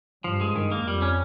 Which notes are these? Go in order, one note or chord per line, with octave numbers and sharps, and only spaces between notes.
G2 F3
G#3
G2 D#3
A#3
F2 G3
C#4